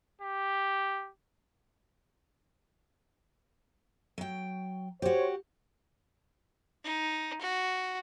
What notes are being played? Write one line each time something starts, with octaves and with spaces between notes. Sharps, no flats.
G4
F#3 G5
F#4 G4 C5 C#5
D#4
F#4